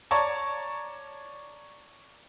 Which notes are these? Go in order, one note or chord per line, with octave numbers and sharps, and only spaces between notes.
C#5 D5 A5 A#5 C#6